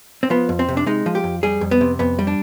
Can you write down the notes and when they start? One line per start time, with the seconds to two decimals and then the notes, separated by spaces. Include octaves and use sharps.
0.23 C4
0.30 F3 B3
0.49 F2
0.59 C4
0.69 C3
0.77 D4
0.86 G#3 D#4
1.06 F3
1.15 G4
1.24 F2
1.43 G3 G#4
1.61 F2
1.71 B3
1.81 C3
1.99 F2 B3
2.19 G3
2.27 D4